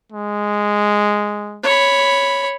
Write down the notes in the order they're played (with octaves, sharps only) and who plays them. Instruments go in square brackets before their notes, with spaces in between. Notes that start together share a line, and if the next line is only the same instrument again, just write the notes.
[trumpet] G#3
[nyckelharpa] C#5 B5